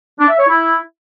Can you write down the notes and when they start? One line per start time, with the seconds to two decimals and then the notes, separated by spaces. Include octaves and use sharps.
0.19 D4
0.29 E5
0.38 C#5
0.48 E4